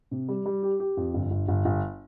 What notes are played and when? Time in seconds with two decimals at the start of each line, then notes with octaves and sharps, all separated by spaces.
0.11 C3
0.28 G3
0.46 G3
0.63 G4
0.80 G4
0.97 F2
1.14 G1
1.31 G1
1.48 G1
1.65 G1